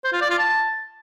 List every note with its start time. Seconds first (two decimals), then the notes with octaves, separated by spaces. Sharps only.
0.04 C5
0.13 F4
0.21 D5
0.30 F4
0.39 A5